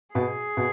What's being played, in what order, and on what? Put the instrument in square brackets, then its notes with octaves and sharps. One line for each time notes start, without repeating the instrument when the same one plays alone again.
[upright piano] B2 [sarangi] G#4
[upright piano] B2